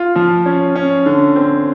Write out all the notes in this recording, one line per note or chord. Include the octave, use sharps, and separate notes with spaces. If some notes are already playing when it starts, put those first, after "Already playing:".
Already playing: F4
F3
C#4
C#4
D3
C4